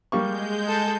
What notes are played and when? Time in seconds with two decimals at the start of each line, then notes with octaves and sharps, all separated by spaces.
0.12 G3 G#3 A#3 C#6 G6
0.68 A4